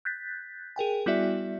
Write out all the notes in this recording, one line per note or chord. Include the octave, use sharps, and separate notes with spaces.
F#6 G6 A6 B6
G#4 A#4 G5 G#5
G3 B3 E4 F#4 D5 E5